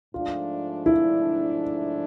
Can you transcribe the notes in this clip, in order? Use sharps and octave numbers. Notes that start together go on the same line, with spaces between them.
G#2 F3 A3 D4 F4
E4